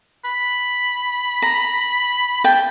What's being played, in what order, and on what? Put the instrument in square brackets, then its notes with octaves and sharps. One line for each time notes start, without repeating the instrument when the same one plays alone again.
[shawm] B5
[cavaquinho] A#5
[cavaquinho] G5 [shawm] A5